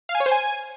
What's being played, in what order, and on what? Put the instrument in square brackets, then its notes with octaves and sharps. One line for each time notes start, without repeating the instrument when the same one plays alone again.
[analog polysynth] F5
G#5
C#5
C5
G#5